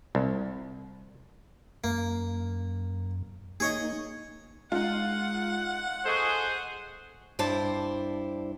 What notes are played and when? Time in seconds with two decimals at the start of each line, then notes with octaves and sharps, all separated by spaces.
0.15 C2
1.84 F#2 A#3
3.60 A#3 D#4 G#4 C#5 D#5
4.72 G#3 D#4 F4 F#5
6.06 G#4 A4 C5 D#5 C#6
7.39 G2 E4 C5 D5 A5